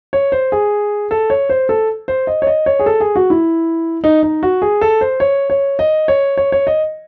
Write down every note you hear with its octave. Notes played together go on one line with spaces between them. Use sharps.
C#5
C5
G#4
A4
C#5
C5
A4
C5
D#5
C#5
D#5
C#5
G#4
A4
G#4
F#4
E4
D#4
D#4
F#4
G#4
A4
C5
C#5
C#5
D#5
C#5
C#5
C#5
D#5